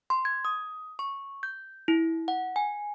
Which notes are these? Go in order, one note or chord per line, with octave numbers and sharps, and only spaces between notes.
C6
G#6
D#6
C#6
G6
E4
F#5
G#5